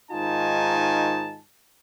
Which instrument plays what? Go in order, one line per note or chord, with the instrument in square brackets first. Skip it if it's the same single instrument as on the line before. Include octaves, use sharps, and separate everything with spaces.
[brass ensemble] G#2 D#3 D#4 F4 G#5 A5